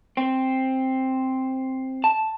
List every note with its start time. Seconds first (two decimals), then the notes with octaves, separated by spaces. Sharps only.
0.17 C4
2.04 A5